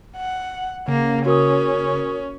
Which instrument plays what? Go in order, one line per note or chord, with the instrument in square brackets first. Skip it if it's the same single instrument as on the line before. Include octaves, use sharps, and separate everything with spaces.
[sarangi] F#5
[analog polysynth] C#3 [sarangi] A#3
[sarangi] C#4 [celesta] F#4 A#4 D#6